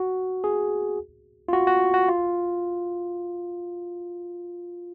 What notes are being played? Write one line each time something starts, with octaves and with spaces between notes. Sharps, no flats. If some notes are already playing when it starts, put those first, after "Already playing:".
Already playing: F#4
G#4
F4
F#4
F#4
F#4
F4